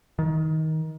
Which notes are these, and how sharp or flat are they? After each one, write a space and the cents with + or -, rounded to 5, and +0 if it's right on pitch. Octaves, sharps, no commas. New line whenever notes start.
D#3 +20